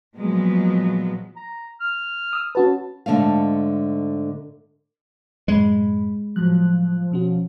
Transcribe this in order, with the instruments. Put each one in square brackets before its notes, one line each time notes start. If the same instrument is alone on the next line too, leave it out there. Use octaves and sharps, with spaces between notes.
[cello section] A#2 F3 F#3 G#3 B3
[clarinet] A#5
F6
[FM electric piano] D#6 E6
[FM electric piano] C#4 F#4 B4 [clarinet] A5
[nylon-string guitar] G#2 D3 F#3 A3 F5
[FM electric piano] F#2 A2 B5 [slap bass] G#3
[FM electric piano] A2 F#3 F#6 [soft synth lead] F3
[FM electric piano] B2 C#4 F#4